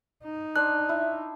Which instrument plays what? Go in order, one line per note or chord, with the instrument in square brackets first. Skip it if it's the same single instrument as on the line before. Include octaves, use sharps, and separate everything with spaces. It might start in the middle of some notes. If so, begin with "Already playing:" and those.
[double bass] D#4
[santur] D4 C5 [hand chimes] F#6
[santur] E4